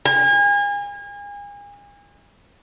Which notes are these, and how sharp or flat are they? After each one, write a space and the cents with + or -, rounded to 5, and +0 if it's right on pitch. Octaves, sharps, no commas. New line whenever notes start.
G#5 -35